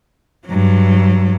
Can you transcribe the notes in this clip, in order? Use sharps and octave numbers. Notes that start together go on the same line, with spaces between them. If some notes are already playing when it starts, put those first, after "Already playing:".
G2 F#3